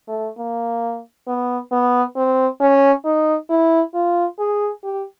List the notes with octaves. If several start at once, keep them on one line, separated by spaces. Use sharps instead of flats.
A3
A#3
B3
B3
C4
C#4
D#4
E4
F4
G#4
G4